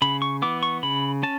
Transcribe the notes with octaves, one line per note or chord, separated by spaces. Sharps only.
C#3 B5
C#6
E3 B3 D6
C#6
C#3 B5
C#4 A5